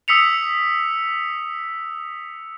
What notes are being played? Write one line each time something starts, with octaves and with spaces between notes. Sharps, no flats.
D#6 E6 B6 C#7 F7